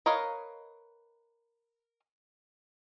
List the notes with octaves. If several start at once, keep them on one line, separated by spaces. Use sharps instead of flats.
A#4 B4 C#5 D#5 F5